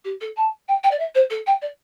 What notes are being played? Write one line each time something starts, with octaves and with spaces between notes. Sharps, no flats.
G4
A4
A5
G5
G5
D5
E5
C5
A4
G5
D5